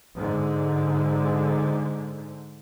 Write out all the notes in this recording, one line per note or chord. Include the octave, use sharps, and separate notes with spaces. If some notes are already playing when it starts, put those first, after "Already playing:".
G#2 D3